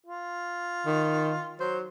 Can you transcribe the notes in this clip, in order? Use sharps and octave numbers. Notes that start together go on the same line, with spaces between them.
F4
D#3
F#3 C5